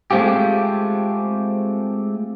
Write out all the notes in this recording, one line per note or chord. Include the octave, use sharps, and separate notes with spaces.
G#3 A3 C4 F4 G4